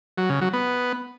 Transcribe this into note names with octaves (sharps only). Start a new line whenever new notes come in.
F#3
C#3
F#3
B3